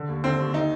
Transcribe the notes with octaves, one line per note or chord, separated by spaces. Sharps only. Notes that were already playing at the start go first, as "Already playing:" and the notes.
Already playing: D3
D#2
D3 C4
D#2
D#4